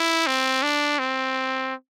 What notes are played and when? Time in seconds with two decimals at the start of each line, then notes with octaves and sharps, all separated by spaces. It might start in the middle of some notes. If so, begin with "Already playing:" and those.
Already playing: E4
0.27 C4
0.63 D4
0.99 C4